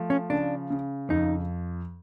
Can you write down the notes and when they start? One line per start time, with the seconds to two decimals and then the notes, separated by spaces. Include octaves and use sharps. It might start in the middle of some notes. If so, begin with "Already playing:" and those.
Already playing: F3 A3
0.10 C#4
0.30 C#3 D4
0.70 C#3
1.10 F2 D#4